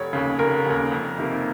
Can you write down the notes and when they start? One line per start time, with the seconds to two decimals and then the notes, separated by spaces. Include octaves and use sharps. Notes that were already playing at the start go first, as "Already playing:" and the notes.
Already playing: F1 C#5
0.13 D#2 C#3
0.39 F1 A#4
0.66 D#2 C#3
0.92 F2
1.18 C3 D#3 A#3